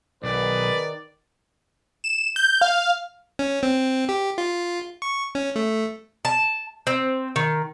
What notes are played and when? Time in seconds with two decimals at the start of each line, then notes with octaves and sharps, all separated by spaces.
0.23 B1 D#3 G#4 B4 D5
2.04 E7
2.36 G6
2.61 F5
3.39 C#4
3.63 C4
4.09 G4
4.38 F4
5.02 C#6
5.35 C#4
5.56 A3
6.25 A5
6.87 C4
7.36 D#3